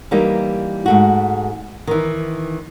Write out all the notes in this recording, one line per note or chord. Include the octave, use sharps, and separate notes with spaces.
E3 G3 A#3 D#4
G#2 A3 F#4
D#3 E3